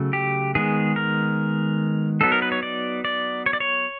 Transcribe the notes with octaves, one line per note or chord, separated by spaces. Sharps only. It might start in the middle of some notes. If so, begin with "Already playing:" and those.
Already playing: C#3 F#3 A3
G4
D#3 G#3 B3 G#4
A#4
F#3 B3 D#4 A4
A#4
B4
C#5
D5
D5
C#5
D5
C#5